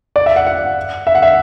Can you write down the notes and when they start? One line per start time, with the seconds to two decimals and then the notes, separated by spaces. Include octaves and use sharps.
0.16 D5
0.26 E5
0.36 F#5
0.47 F#5
1.07 E5
1.15 F#5
1.22 E5